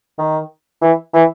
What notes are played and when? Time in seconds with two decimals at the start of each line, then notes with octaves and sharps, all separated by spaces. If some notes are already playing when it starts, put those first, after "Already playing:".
0.18 D#3
0.81 E3
1.13 E3